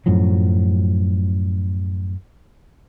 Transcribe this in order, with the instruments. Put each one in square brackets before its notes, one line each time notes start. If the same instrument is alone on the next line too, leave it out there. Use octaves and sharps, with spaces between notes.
[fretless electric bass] F#2 A2 F3 F#3